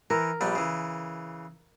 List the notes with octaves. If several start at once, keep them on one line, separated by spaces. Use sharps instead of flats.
E3 A#4
A#1 G3 B3
C#3 E3